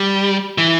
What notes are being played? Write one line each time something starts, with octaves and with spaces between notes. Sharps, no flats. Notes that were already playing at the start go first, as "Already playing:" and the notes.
Already playing: G3
E3